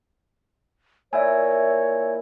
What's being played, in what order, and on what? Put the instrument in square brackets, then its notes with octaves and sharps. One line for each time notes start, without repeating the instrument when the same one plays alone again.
[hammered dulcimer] A#2 E4 [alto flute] C#5 [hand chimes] E5 G#5